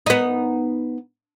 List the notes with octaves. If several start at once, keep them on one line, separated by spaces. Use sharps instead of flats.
B3 D#4